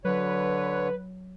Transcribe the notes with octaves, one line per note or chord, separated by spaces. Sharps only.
D3 F#3 B4 C#5